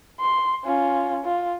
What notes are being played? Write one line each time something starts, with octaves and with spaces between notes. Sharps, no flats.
C6
C#4 F4
F4